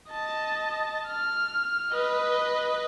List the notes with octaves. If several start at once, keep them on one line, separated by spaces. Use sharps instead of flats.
D#5 A5
F6
B4 D#5